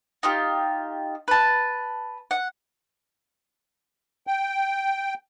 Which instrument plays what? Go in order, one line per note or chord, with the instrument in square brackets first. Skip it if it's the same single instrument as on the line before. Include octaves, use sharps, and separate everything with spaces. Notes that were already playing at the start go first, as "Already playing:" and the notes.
[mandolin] D#4 F4 G4
B4 A5
F#5
[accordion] G5